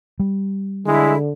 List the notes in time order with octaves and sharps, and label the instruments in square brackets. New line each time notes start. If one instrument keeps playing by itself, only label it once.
[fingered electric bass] G3
[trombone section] D3 [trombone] G#3 [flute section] E4